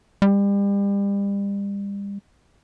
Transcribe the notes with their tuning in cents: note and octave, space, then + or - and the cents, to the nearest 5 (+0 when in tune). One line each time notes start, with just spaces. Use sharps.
G3 +35